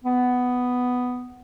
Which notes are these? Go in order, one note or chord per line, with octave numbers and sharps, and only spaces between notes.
B3